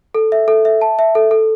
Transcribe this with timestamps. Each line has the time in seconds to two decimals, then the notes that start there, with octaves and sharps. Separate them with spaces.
0.15 A4
0.32 E5
0.48 A4
0.65 E5
0.82 A5
0.99 E5
1.15 A4
1.31 A4